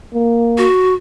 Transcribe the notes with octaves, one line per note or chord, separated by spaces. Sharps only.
A#3
F#4